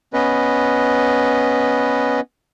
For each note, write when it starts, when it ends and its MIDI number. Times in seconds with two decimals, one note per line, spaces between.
0.14 2.20 59
0.14 2.20 61
0.14 2.20 71
0.14 2.20 75